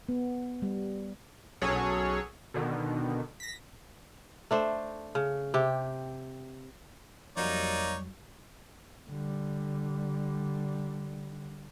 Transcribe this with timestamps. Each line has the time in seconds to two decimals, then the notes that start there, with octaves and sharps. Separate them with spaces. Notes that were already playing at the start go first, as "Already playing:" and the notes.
0.09 B3
0.62 G3
1.62 B1 F#3 C#4 G#4 A4 C#5
2.54 B2 D3 D#3
3.40 A#6 B6
4.51 A3 D4 C5
5.15 C#3
5.54 C3 G4
7.37 F2 F#3 G3 A#3 D#4 C#5 D5
9.09 D3 G3